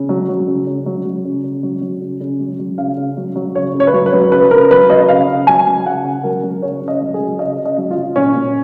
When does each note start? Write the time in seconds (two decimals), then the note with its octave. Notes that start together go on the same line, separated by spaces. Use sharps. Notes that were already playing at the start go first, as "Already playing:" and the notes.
Already playing: C#3
0.09 F#3
0.29 F#3
0.47 C#3
0.66 C#3
0.86 F#3
1.05 F#3
1.25 C#3
1.43 C#3
1.63 F#3
1.81 F#3
2.01 C#3
2.20 C#3
2.40 F#3
2.60 F#3
2.78 C#3 F5
2.97 C#3
3.17 F#3
3.36 F#3
3.55 C#3 C#5
3.74 C#3
3.80 C#5
3.87 B4
3.93 F#3 C#5
4.06 B4
4.13 F#3
4.31 C#3 B4
4.51 C#3 A#4
4.71 F#3 B4
4.90 F#3 D#5
5.08 C#3 F5
5.28 C#3
5.47 F#3 G#5
5.67 F#3
5.86 C#3 F#5
6.04 C#3
6.24 F#3 A#4
6.43 F#3
6.62 C#3 C#5
6.82 C#3
6.88 D#5
7.01 F#3
7.14 G#4
7.20 F#3
7.39 C#3 D#5
7.59 C#3
7.65 D#5
7.77 F#3
7.91 F4
7.97 F#3
8.16 A#2 C#4
8.35 A#2